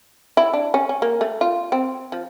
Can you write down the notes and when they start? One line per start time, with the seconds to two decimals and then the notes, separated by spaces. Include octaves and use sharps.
0.37 E4
0.53 D4
0.74 C#4
0.89 C#4
1.02 A#3
1.21 A3
1.41 F4
1.72 C4
2.12 F3